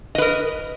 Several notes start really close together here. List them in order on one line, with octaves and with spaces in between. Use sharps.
D#5 B4 A#4